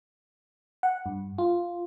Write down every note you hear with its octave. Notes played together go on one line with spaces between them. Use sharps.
F#5
G2
F4